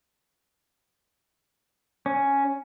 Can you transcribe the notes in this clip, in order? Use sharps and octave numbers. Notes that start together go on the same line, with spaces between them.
C#4